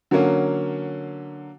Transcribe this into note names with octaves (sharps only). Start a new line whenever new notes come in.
D3 F#3 A#3 C#4